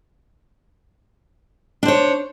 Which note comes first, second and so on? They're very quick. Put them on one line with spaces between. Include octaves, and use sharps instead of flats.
D4 C5 C#5